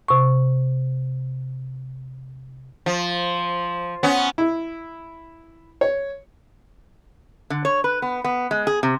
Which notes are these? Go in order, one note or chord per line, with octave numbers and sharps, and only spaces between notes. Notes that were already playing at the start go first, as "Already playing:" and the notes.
C3 C#6
F3
B3 C#4
E4
C#5
D3
C#5
B4
B3
B3
G#3
G#4
C3